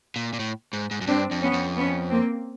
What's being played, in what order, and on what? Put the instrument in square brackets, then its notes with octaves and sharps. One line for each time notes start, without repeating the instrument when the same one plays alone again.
[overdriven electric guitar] A#2
A#2
A2
G#2
G#2
F#2
[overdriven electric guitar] G2 [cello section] C4 D4
[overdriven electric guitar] F2
[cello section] B3 C#4
[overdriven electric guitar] F2
[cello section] B3 C#4
A#3 C4